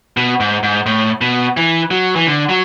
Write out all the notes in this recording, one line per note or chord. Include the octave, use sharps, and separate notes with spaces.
B2
G#2
G#2
A2
B2
E3
F#3
E3
D3
F#3